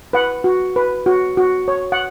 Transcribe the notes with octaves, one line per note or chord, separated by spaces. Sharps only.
B4 F#5
F#4
B4
F#4
F#4
C#5
F#5